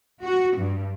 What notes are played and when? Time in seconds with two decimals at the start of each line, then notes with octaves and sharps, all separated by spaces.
0.23 F#4
0.57 G2